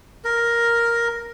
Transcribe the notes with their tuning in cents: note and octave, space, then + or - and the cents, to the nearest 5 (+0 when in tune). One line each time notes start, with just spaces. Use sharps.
A#4 +5